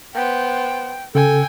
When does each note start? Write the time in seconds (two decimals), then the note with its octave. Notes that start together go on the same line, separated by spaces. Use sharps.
0.14 B3 C5 G5
1.15 C#3 A4 G5 G#5